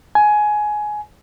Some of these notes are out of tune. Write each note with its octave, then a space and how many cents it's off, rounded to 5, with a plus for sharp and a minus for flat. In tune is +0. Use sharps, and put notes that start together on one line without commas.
G#5 +15